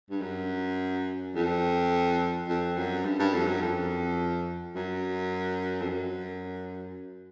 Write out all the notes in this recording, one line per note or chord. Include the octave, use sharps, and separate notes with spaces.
G2
F#2
F2
F2
F#2
G2
G2
F2
F#2
F2
F#2
F2
F#2